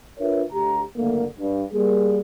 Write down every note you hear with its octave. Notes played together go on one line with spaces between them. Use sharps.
D4 F4 A#4 B4 C#5 E5
D2 G4 A#5
F#1 D3 A3 A#3
G2
G3 A#3 G#4